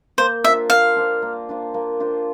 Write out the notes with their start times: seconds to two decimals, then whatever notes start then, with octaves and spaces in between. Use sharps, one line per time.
0.18 A#3 C5
0.44 D4 F4 C5 E5
0.70 A#3 F5
0.96 D4 F4 C5
1.22 A#3
1.49 D4 F4 C5
1.74 A#3
2.00 D4 F4 C5